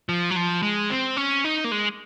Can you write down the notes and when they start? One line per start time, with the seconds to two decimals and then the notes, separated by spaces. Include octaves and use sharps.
0.09 F3
0.31 F#3
0.36 F3
0.63 G#3
0.90 C4
1.17 C#4
1.45 D#4
1.64 A#3
1.72 G#3